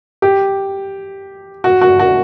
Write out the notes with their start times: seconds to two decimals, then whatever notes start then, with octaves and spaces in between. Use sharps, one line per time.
0.22 G4
1.64 F#4
1.81 F#4
1.99 F#4